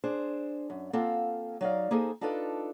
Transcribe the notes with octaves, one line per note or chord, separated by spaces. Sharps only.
D4 G#4 C5
F#2
A#3 C4 F4 A4 F5 F#5
F#3 D#4 D5 F5
A#3 D#4 G#4 A4 C5 G#5
D4 D#4 F4 A4 B4 D5